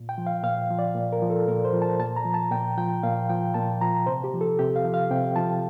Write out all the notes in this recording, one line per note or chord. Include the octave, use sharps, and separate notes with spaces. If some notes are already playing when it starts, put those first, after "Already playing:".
Already playing: A#2
G5
F3
F5
A#2 F5
F3
D5
A#2
A#4
F3
A4
A#2 A#4
C5
F3
A5
A#2 A5
A#5
F3
A5
A#2 G5
F3 G5
A#2 F5
F3 G5
A#2 A5
F3 A#5
C3 C5
G4
F3
A4
C3 G4
F5
F3
F5
C3 G5
F3 A5